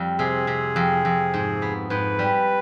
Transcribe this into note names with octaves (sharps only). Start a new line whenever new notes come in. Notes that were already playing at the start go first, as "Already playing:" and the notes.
Already playing: F2 G3
C3 G#4
C3
F2
F2
G#2
B3
G#2 B4
G3